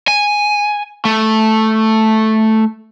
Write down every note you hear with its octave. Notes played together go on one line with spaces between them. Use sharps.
G#5
A3